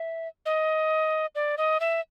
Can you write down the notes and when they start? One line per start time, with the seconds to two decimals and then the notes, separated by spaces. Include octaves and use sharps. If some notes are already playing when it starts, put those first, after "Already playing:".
Already playing: E5
0.46 D#5
1.35 D5
1.58 D#5
1.80 E5